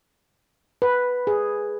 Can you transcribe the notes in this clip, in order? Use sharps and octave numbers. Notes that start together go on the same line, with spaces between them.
B4
G#4